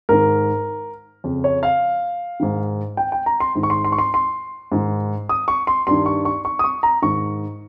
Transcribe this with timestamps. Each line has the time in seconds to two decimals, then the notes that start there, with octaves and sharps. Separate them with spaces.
0.09 G#2 D#3 A#4
1.24 F2 C#3
1.44 C#5
1.63 F5
2.40 G#2 D#3
2.97 G5
3.12 G5
3.26 A#5
3.40 C6
3.55 G#2 D#3
3.63 C#6
3.70 C6
3.84 C6
3.92 C#6
3.98 C6
4.14 C6
4.72 G#2 D#3
5.29 D#6
5.48 C#6
5.67 C6
5.87 G2 D#3 C6
6.06 C#6
6.25 C#6
6.45 C#6
6.59 D#6
6.64 C#6
6.83 A#5
7.02 G#2 D#3 C#6